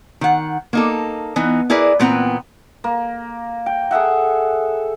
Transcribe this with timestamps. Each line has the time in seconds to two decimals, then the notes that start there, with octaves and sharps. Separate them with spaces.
0.21 D#3 F#5
0.73 A#3 D#4 A4
1.36 E3 B3 D#4
1.70 E4 G#4 A#4 B4 D5
2.00 A#2 E3 B3 C4 G5 A#5
2.84 A#3
3.66 G5
3.91 G#4 A4 E5 F#5